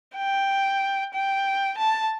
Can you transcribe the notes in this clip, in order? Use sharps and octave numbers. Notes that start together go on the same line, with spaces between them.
G5
G5
A5